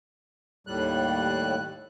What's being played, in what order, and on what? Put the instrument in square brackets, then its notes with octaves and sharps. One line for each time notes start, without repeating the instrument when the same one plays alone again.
[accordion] D#2 A2 G3 F#6